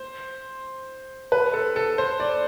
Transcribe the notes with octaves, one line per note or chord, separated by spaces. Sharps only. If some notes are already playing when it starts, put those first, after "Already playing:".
Already playing: C5
B4
A4
A4
C5
D5